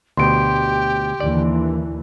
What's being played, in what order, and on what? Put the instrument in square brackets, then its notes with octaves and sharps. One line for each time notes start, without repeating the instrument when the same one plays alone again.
[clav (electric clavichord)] D2 B2 [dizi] G4 [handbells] C6 D7
[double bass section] D#2 D3 E3 [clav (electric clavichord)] D5